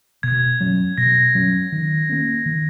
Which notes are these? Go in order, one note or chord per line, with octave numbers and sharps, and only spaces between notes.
B2 G#6
F#3 C#4
B2 A#6
F#3 C#4
D#3
A#3 C#4
D#3